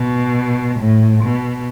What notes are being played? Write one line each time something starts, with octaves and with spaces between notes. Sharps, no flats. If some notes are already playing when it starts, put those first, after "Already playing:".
Already playing: B2
A2
B2